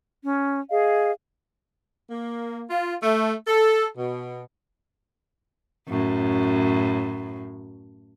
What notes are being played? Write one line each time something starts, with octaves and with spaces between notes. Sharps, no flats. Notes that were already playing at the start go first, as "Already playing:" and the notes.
C#4
G#4 D#5 F5
A#3
F4
A3
A4
B2
F#2 A2